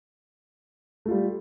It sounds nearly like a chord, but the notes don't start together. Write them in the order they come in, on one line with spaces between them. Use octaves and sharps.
A3 F4 G3